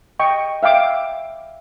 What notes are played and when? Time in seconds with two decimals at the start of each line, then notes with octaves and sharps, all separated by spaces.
0.20 D#5 G5 C#6
0.63 E5 F5 G5 D6